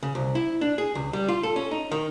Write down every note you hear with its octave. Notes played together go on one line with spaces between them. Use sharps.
C#3
C2
E4
D4
G#4
C#2
G3
F4
A4
C#4
D#4
D#3